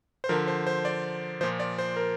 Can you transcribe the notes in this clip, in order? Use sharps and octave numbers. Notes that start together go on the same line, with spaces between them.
C5
D3 F3 A#4
C5
C5
D5
A#2 F3 C5
D5
C5
A#4